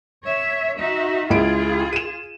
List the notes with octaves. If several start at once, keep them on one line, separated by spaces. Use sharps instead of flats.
C#5 E5
D#4 F#4 E5
C#2 E4 F4 G#4 D7
D#7 E7